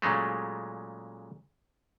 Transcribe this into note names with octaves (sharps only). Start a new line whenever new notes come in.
A#2 C#3 F#3 G#3 A3